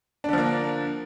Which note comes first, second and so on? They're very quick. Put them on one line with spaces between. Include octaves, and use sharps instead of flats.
D4 D3 F3 A#3